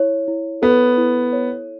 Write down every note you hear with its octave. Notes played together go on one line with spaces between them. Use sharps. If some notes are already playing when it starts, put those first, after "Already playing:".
Already playing: E4 C#5
E4
B3 A4
E4
C#5